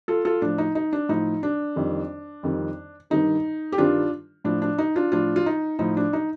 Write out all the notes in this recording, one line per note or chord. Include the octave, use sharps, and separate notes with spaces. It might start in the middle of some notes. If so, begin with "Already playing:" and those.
F4 A4
F4 A4
A2 F3 D4
D#4
D#4
D4
A2 F3 D#4
D4
F2 D#3 G3
F2 D#3 G3
G2 D#3 G3 D#4
G4
G2 D#3 G3 D4 F4
A2 F3 D4
D4
D#4
D4 F4
A2 F3 D4 F4
F4
D#4
A2 F3 D#4
D4
D#4